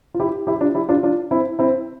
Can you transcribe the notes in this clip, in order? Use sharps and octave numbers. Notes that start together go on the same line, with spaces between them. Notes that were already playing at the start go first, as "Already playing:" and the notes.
F4
E4 G4
E4 G4
D4 F4
E4 G4
D4 F4
D4 F4
C4 E4
C4 E4